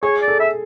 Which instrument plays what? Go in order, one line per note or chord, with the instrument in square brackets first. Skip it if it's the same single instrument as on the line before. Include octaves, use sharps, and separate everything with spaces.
[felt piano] G#4 [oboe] C#5
[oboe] D5
[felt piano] A4
[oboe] E5